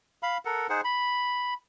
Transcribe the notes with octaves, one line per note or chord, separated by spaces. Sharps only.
F5 B5
A4 A#4 F#5
D#4 G#4 C5 F#5
B5